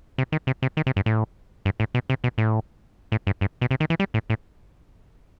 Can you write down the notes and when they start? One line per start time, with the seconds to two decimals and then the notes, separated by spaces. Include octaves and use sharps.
0.18 C3
0.32 D#3
0.47 C3
0.63 C3
0.77 D#3
0.87 C3
0.96 G2
1.06 A2
1.65 G2
1.80 A2
1.95 B2
2.10 C3
2.24 B2
2.38 A2
3.12 A2
3.27 G2
3.41 G2
3.61 B2
3.71 C3
3.80 D#3
3.90 E3
4.00 G3
4.14 A2
4.30 A2